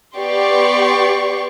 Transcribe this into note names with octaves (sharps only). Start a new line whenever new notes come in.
B3 G4 D5 C6 C#6